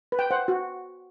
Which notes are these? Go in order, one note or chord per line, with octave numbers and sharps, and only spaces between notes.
B4
G5
C5 F#5
F#4